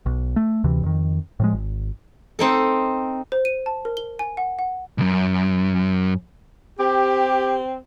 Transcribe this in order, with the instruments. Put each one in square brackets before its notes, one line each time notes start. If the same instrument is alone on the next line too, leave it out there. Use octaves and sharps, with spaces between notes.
[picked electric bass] B1
A3
D2 C3 E3
F2 D#3
A2 F3 G#3
G#1
[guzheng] C4 D#4 A4
[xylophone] C5
D#7
A5
A#4
G7
G#5
F#5
F#5
[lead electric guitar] B1 F#2
[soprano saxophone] C4 [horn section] G4